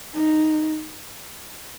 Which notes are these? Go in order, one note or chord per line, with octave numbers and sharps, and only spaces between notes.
D#4